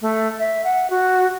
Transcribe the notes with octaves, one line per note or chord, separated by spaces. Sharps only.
A3
E5
F#5
F#4